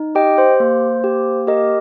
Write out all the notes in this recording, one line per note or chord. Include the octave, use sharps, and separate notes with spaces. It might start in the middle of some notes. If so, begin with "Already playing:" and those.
Already playing: D#4
G4 D#5 G5
C5
A#3
G4
G4 A#4 D#5